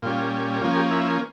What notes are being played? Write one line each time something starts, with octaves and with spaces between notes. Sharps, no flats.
A#2 G3 C#4 F4
F3 A#3 C#4 F4
G4
E4